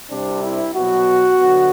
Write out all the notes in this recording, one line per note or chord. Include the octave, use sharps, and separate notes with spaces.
C2 C3 G3 C4 D4
E4
B2 F#3 B3 F#4
D3 F#3 B3